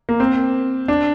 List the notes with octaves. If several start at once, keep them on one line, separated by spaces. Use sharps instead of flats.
A#3
C4
D4